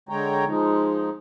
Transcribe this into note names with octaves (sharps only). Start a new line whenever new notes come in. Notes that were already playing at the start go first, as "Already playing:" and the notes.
D3 G#3 C#5 G5 A#5
F3 G#3 D#4